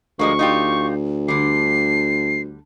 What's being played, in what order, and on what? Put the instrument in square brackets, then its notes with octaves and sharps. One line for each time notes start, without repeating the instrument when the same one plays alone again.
[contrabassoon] D2 [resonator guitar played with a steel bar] F3 G#3 A#3 [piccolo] C#6
[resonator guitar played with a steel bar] D#4 F4 G4
[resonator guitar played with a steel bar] D3 G3 [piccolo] C7